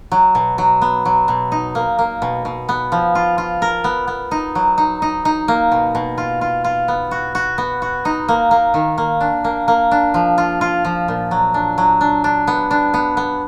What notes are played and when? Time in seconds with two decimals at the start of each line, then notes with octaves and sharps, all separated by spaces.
0.12 F#3
0.35 B2
0.58 F#3
0.82 B3
1.05 F#3
1.28 B2
1.52 D#4
1.75 A#3
1.99 A#3
2.22 B2
2.45 B2
2.69 B3
2.92 F3
3.15 F4
3.38 F4
3.62 A#4
3.84 B3
4.08 B3
4.31 D#4
4.55 F#3
4.78 D#4
5.02 D#4
5.25 D#4
5.48 A#3
5.72 B2
5.95 B2
6.18 F4
6.41 F4
6.64 F4
6.88 B3
7.11 F#4
7.35 F#4
7.58 B3
7.82 F#4
8.05 D#4
8.28 A#3
8.51 A#3
8.74 D#3
8.98 A#3
9.21 D4
9.44 A#3
9.68 A#3
9.91 D4
10.14 F3
10.38 F4
10.61 F4
10.85 F3
11.08 A#2
11.31 F#3
11.54 D4
11.78 F#3
12.01 D4
12.24 D4
12.47 B3
12.71 D4
12.94 B3
13.17 B3